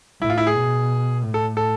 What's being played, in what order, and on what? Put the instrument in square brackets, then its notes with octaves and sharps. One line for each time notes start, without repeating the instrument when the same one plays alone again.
[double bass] A2 [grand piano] E4
[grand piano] F4
E4
G#4
[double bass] B2
A2
[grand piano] A4
A4